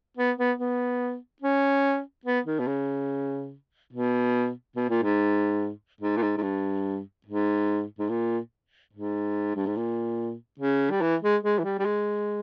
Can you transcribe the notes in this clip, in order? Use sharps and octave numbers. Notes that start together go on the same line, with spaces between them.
B3
B3
B3
C#4
B3
D#3
B2
C#3
B2
B2
A#2
G#2
G#2
A#2
G#2
G#2
G2
G#2
G#2
A#2
G#2
G2
G#2
A#2
C#3
G3
E3
G#3
G#3
E3
G3
G3
G#3